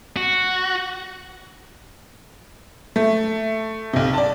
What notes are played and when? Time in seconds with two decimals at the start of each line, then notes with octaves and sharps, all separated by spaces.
0.16 F#4
2.96 A3
3.93 B1 C3
4.13 D5 A5